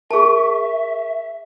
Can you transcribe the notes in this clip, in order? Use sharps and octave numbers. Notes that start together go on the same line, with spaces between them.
G#4 A#4 E5 A5 C#6